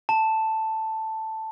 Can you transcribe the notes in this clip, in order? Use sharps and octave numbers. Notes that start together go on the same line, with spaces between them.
A5